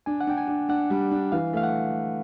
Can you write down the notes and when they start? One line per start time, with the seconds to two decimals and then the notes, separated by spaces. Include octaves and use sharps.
0.06 D4 G#5
0.21 F#5
0.27 D4 G5
0.37 G#5
0.48 D4
0.69 D4 F#5
0.90 G3
1.11 D4
1.32 E3 F5
1.53 A3 F5
1.63 F#5